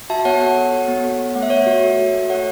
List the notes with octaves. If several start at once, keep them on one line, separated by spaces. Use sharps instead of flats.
F#4 E5 A5
B3 C#5 F#5
A4
A4
F#4
B3
A4
B3
A3 F#5
E5
A3 C#5
E5
F#4
A4
F#4
A3
A4 C#5 F#5